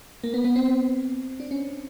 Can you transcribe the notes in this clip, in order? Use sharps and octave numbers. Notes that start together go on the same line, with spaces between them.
A#3
B3
B3
C4
D4
C#4